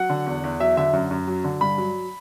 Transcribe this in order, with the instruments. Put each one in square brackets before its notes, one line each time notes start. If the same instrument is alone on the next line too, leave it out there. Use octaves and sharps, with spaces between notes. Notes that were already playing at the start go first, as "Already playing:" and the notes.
Already playing: [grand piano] F#3 F#5
D3
E2
E2
F#3 E5
D3 E5
F#2
F#2
F#3
D3
G2 B5
F#3